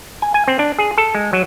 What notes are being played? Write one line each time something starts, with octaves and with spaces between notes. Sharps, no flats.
G#5
G#5
C4
D4
G#4
A4
G#3
F#3